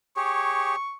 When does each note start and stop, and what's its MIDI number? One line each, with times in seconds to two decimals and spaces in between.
0.17 0.76 67
0.17 0.76 68
0.17 0.76 73
0.17 0.96 85